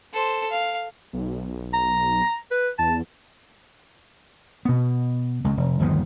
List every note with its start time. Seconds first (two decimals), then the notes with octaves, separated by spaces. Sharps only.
0.13 A4 C5
0.50 F5
1.13 B1
1.73 A#5
2.51 B4
2.78 E2 A5
4.65 B2 B3
5.44 C#2
5.57 F1
5.80 G1 D#2 F3 B3